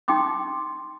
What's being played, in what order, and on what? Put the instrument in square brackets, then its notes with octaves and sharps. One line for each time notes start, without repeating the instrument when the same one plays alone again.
[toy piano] D#4 G5 C6 D6 D#6